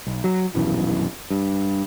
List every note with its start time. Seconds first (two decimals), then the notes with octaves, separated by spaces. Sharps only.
0.07 B1
0.24 F#3
0.54 D#1 B1 F#2 E3
1.30 G2